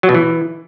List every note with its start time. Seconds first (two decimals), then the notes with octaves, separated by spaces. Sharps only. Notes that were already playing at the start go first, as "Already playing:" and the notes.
0.03 F#3
0.09 B2
0.15 E3